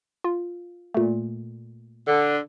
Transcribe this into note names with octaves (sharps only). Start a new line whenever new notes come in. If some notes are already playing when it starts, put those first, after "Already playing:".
F4
A#2 A3
D3